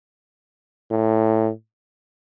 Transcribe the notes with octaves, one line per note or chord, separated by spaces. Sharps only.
A2